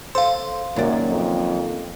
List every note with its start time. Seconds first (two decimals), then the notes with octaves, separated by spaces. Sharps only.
0.15 A4 C5 F5 C6
0.76 C#2 F#2 D#3 F#3 A#3 D5
1.10 F2